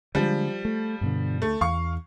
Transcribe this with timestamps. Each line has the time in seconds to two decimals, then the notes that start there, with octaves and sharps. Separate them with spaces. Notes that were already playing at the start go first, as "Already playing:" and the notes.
0.15 D3 F3 G3 G#3
0.65 A3
1.01 G2 B2 D3
1.42 D2 A3
1.61 E2 F5 C#6